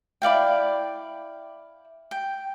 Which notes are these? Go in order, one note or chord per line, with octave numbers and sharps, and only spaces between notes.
E4 D5 F5 G5
G5